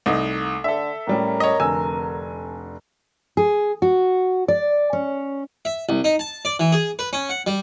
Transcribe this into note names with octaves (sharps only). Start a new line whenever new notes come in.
C2 A3 D#4
D3 A4 E5
A2 G3 C#4 A#4
C#5 D#5
F1 D3 G#5 E6
G#4
F#4
D5
C#4
E5
C2
D#4
A5
D5
E3
G#4
B4
C#4
F#5
G3